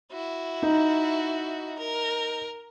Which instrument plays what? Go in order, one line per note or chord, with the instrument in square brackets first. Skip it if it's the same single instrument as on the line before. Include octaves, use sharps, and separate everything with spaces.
[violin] E4 F#4
[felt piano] D#4
[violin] A#4